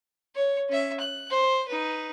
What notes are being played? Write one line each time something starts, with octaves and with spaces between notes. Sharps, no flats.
C#5
C#4 E5
F#6
C5
D#4 B4